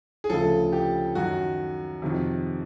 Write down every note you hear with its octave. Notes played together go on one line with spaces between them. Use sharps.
G#4
D2 C#3 F3 A4
G4
F#2 D#3 F#4
F2 C3 D#3